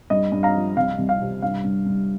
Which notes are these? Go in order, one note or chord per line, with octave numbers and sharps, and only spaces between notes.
G2 D#5
G2
F5 A#5
F3
C2 F5
C2
F5
C3
G2 F5
G2
G2